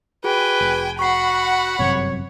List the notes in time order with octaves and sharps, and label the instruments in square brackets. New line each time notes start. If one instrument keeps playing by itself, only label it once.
[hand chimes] F#4 G#4 [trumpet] B4 [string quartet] G5 G#5
[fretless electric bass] F1
[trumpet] F#4 [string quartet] F#5 B5 [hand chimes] C#6 C7
[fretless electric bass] G1 F#2 C3 [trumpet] C#5